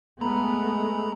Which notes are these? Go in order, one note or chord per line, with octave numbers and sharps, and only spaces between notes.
G#3 A3 B3 A#5 B5